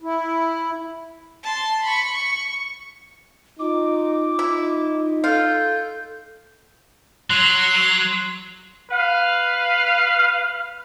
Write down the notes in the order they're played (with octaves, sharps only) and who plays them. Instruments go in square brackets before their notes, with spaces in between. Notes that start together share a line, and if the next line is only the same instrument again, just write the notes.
[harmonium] E4
[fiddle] A5 C6
B5 C#6
C#6
[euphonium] D#4 [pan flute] F4 [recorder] D6
[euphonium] D#4 [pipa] E4
[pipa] F4 [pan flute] A4 [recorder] G6
[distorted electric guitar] F#3 [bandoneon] C6 F#6
[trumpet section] B4 F5